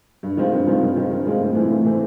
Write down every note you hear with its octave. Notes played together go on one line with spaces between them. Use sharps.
G2
D#3 G#3 C4 F4
G2
D#3 G#3 C4 F4
G2
D#3 G#3 C4 F4
G2
D#3 G#3 C4 F4
A2
E3 A3 C4
A2
E3 A3 C4